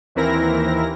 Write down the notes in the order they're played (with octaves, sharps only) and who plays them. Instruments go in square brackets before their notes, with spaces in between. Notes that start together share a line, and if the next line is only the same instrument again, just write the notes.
[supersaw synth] D#2 E3 C4 E4 A#4 A#6